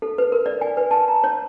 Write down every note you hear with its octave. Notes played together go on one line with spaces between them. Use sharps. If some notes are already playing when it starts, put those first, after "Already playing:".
A4
B4
A#4
D5
G#5
B4
A5
A#5
C#5